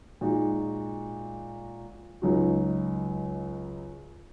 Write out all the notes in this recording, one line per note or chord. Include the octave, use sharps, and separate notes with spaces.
A#2 G#3 D#4 F#4
C#2 C#3 F#3 D#4 F#4